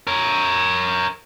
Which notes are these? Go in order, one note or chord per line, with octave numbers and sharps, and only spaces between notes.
A#4 C#5